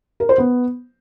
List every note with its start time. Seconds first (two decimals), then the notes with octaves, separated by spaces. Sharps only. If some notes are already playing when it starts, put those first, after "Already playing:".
0.20 A#4
0.29 C5
0.38 B3